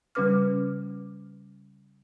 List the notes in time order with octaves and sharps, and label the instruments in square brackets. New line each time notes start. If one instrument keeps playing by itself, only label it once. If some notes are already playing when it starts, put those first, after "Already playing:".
[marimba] C#3 G3 C#4 B4 D6 F6